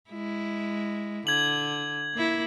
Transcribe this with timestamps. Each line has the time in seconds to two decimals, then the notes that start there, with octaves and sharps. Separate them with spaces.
0.11 G#3 E4
1.27 D3 G#6 F#7
2.14 A#3 E4